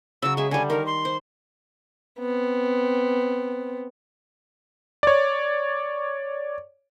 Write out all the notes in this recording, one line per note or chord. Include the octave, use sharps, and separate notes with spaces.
C#3 F#3 E6
G#3 G#4 E5
D3 G3 G#5
D#3 A#4
C6
C5
B3 C4
C#5 D5